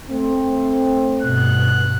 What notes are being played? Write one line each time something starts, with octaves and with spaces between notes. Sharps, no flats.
A3 C4
G2 B2 F#6